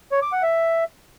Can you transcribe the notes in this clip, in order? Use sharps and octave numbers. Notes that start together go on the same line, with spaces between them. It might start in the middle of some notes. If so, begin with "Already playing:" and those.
C#5
D6
F#5
E5